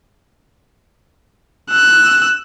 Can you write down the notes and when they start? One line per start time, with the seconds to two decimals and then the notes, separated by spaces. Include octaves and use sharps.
1.71 E6 F#6